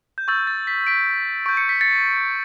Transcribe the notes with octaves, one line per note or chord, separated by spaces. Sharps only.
G6
C#6 E6 G6 A6
A6
B6
B6 D7
C#6 G6 D7
C#7
B6
A6 C#7